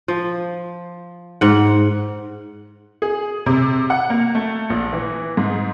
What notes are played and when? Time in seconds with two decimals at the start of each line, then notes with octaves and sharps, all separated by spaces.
0.08 F3
1.41 G#2 F#5
3.02 G#4
3.46 C3
3.90 F#5
4.10 A#3
4.35 A3
4.70 A#1
4.93 E3
5.37 G#2